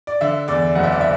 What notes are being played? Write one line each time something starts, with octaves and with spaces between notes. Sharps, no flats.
D5
D3 E5
E2 D5
F#1 F#5
E5
D5
E5